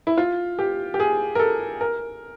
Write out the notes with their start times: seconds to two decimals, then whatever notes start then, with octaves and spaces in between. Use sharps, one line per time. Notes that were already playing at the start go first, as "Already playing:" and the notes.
0.07 E4
0.17 F4
0.59 G4
0.94 G4
1.00 G#4
1.35 A#4
1.39 A4
1.81 A#4